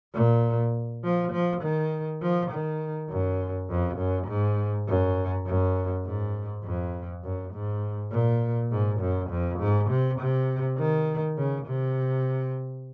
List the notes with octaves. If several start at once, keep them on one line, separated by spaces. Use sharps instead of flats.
A#2
F3
F3
D#3
F3
D#3
F#2
F2
F#2
G#2
F#2
F#2
G#2
F2
F#2
G#2
A#2
G#2
F#2
F2
G#2
C3
C3
D#3
C#3
C3